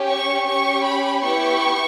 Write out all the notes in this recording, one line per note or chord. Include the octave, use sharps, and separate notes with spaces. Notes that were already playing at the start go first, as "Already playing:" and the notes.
Already playing: C#4 G4
C#6
C#4 G4 C#6
B5
B3 E4 G4 C#6